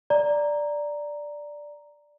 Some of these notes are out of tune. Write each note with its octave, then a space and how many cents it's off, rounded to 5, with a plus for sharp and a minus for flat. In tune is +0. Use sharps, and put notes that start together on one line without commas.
D5 +0 A#5 +0